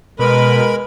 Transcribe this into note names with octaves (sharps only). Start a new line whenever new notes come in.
B2 G#3 A#4 B4 B5